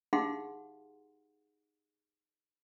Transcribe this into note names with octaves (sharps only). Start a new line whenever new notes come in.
D#4 G4 G#4 F5 F#5 C6